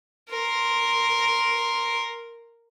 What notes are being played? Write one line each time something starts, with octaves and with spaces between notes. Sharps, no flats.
A#4 C6